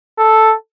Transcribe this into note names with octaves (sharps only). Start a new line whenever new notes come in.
A4